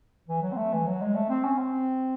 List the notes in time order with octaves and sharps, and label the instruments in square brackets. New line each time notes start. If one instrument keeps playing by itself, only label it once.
[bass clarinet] E3
F#3
C4
A3
E3
F#3
G#3
A3
C4
C#4
C4